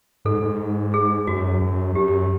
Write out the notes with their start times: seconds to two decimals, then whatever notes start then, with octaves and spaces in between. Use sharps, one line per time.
0.25 G#2 A4
0.42 G#2
0.94 G#4
1.27 F#2 F#4
1.62 F#2
1.95 F#2 G4